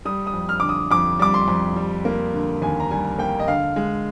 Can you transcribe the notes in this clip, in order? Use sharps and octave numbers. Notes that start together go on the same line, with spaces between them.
G3 D#6
D#6
F2
F6
D3 D6
D#6
F2 D6
G3 D6
C6
F2
G3
A#3
D3
D#2 G#5
A#5
G3 G#5
A#3 G5
D#5
D3 F5
G#3